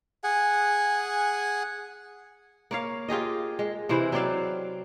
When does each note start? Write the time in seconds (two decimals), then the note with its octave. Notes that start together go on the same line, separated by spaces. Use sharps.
0.24 G#4 F#5 G#5
2.71 A#3 C#5 F5
3.09 F4 G4 G#4 D#5
3.59 G#3
3.89 C3 E3 E4 C5
4.12 F#3 C4 D5 F5